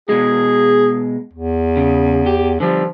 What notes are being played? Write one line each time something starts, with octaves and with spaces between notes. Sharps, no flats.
B2 G#3 G#4
E2
C#3
G4
D3 F3 G3